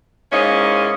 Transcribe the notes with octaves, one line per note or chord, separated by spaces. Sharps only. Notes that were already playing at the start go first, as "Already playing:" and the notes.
G#2 A#3 C#4 E4 D#5